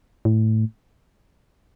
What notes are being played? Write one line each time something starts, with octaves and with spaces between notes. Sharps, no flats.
A2